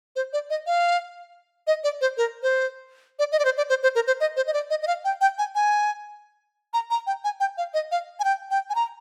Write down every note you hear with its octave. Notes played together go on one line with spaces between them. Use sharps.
C5
D5
D#5
F5
D#5
D5
C5
A#4
C5
D5
D#5
D5
C5
D5
C5
C5
A#4
C5
D#5
C5
D#5
D5
D#5
D#5
F5
G5
G5
G#5
G#5
A#5
A#5
G5
G#5
G5
F5
D#5
F5
G#5
G5
G5
G#5
A#5